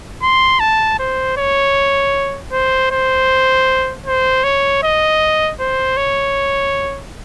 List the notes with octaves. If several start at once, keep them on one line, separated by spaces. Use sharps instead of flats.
C6
A5
C5
C#5
C5
C5
C5
C#5
D#5
C5
C#5